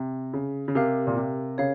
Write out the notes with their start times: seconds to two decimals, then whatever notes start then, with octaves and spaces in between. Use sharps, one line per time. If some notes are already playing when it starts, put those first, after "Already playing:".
Already playing: C3
0.34 C#3
0.68 C#3
0.75 C3 G4 A#4 F5
1.07 A#2
1.16 C3
1.58 C#3 C#5 F5